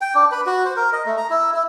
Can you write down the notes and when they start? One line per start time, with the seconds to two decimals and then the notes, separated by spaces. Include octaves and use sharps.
0.01 G5
0.15 D4
0.31 B4
0.46 F#4
0.65 C5
0.76 A#4
0.93 D#5
1.06 A3
1.17 A#5
1.30 E4
1.54 E4